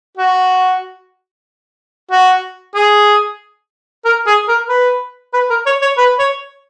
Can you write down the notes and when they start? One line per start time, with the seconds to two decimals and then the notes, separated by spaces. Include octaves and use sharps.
0.18 F#4
2.11 F#4
2.75 G#4
4.05 A#4
4.27 G#4
4.48 A#4
4.69 B4
5.34 B4
5.50 A#4
5.66 C#5
5.82 C#5
5.98 B4
6.19 C#5